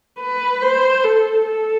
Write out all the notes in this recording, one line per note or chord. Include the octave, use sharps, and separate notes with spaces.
B4
C5
A4
A4